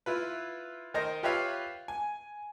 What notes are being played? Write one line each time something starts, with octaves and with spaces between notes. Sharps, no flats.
E4 F4 B4
D#3 A#4 C5 D#5
F4 G4 B4 C#5 E5 F5
G#5